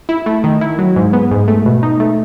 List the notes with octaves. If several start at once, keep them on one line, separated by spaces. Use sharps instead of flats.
E4
A3
D#3
E4
F#3
G#2
B3
G#2
A3
B2
D#4
A3